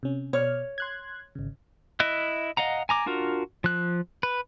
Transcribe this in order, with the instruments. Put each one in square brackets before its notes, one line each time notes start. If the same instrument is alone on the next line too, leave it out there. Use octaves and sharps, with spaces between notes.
[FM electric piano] C3 C#4
[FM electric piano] B2 D5 F6 [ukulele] C#5
[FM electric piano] C6 F#6 G#6
G#1 C#3
[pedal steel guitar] E4 D#5 E5 F#6
D#5 F5 F#5 A#5
G#5 A#5 D6
D4 F4 F#4 A#4
F3 F#6
B4